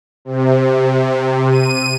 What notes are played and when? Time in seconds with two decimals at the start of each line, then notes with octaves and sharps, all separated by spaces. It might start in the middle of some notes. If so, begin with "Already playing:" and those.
0.25 C3
1.50 D#7